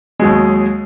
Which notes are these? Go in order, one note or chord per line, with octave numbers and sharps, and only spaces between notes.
D#2 F#3 G#3